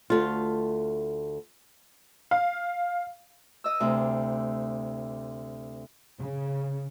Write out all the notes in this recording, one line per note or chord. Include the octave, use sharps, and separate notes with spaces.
D2 A3 F4
F5
D#5 E6
D2 C3
C#3